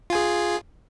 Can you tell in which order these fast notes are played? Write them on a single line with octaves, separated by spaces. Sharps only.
F4 G#5 G#4